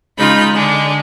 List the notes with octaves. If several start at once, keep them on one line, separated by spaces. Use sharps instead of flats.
C#3 G#3 D#4 F4 B5 G6
D3 G#3 D4